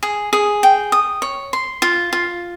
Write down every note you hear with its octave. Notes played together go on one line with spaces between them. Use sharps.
G#4
G#4
G5
D#6
C#5
C6
F4
F4